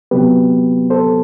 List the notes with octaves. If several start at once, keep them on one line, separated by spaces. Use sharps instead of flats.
C3 F#3 B3 G4 B4
A4 C5